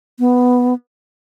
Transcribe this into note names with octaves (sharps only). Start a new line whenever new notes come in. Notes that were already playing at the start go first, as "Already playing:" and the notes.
B3